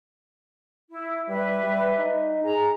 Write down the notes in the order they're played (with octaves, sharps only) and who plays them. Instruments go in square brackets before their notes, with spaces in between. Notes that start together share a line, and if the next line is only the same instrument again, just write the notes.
[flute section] E4
[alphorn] G3 [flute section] B4 E5
[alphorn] G3
D#4
[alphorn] G#4 [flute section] A#5